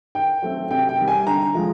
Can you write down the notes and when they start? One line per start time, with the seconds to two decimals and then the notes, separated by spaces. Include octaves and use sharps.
0.15 D#3 G5
0.42 F#3 A3 C4
0.70 C3 G5
0.89 G5
0.98 D#3 G3
1.08 G#5
1.27 D3 A#5
1.54 F3 G#3